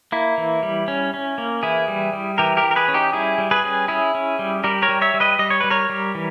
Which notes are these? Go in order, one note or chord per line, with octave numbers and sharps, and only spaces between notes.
A#3 E4
E3
G3
C#4
C#4
A#3
E3 E4 G#4
G3
G3
E3 G4 A#4
G4 A#4
E3
A#4
G#4 B4
C#4
D#4 G4
G3 E4 G#4
G3
G#4 B4
C#4
C#4 E4 G#4
C#4
G3
G3 G4 A#4
A#4 C#5
G3
C#5 E5
G3
B4 D#5
G3 D#5
C#5
G3 B4
A#4 C#5
G3
E3